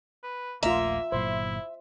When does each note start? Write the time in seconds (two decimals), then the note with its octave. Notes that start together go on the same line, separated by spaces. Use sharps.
0.23 B4
0.63 D#1 A#1 A3 A#3 F4 E5 A#5
1.12 G1 A#2 F#3 E4 C5